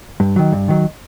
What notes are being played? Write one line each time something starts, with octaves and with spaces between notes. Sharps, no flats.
G2
D#3 F#3
G2
D#3 F#3